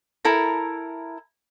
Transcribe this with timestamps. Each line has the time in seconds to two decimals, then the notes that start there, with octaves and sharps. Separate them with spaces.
0.25 E4 A4 A#4 A#5